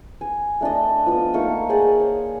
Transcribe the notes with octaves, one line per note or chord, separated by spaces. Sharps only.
G#5
A3 D4 D5 D#5
F3 B3 D#6
A3 A#3 D#4 C#6
G#4 C5 D5 F#5
C#5